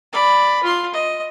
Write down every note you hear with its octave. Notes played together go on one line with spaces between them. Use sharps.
D5 B5
F4 C6
D#5